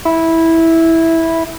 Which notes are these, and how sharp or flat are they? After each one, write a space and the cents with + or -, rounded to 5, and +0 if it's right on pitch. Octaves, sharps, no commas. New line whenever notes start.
E4 -10